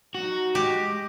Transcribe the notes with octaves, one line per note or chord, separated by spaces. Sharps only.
F#3 D#4 F#4
G#3 G4 D#5